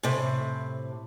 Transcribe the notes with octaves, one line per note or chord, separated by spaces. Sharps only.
A2 C3